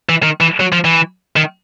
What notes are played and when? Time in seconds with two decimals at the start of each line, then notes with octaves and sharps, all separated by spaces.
0.09 E3
0.23 D#3
0.41 E3
0.60 F#3
0.72 F3
0.85 E3
1.36 D#3